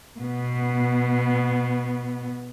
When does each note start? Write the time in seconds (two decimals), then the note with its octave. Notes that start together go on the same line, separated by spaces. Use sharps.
0.20 B2 B3